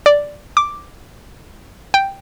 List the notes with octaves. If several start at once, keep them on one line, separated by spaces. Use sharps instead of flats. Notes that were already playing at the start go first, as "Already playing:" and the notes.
D5
D6
G5